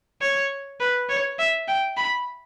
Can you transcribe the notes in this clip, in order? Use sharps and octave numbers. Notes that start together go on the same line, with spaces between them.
C#5
B4
C#5
E5
G5
B5